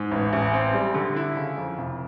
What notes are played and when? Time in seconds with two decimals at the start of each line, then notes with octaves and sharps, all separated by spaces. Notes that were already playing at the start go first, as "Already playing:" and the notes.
Already playing: G#2
0.11 A1
0.33 A1
0.54 C4
0.74 G3
0.94 D3
1.16 E4
1.37 C#3
1.58 F2
1.78 F1